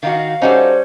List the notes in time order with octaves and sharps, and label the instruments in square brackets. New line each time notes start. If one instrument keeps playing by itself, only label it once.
[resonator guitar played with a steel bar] D#3 D#4 F#4 [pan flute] F5
[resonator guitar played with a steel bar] G3 C#4 [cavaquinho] D#4 F#4 A4 [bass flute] C5